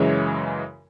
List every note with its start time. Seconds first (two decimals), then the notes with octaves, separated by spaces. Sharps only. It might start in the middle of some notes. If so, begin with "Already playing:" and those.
Already playing: F#2 C#3 E3 G#3 C#5 E5